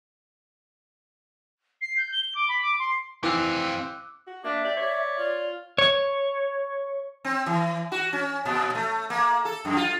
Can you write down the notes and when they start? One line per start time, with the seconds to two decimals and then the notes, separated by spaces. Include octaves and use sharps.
1.81 C7
1.97 G6
2.12 G7
2.35 D6
2.48 B5
2.61 D6
2.79 C6
3.24 E3 C4 G4 F5 D6 E6 F#6
4.27 F#4
4.44 A#3 D4 E5
4.65 G4 D5
4.77 C#5 D5
5.19 F4 D5
5.78 C#5
7.25 C4
7.46 E3
7.92 F#4
8.13 C#4
8.45 A#2
8.75 A3
9.10 A#3
9.45 A4
9.65 F#2
9.77 F4